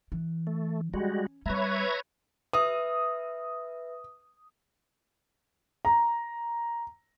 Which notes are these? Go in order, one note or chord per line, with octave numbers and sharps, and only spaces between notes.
E3
A3
G3 G#3 C#4 F#4
G3 C4 B4 C#5 E5 A#5 G#6
B4 E5 D#6
A#5